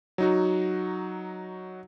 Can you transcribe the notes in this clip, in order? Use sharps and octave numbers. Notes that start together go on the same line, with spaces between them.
F#3 D#4 F#4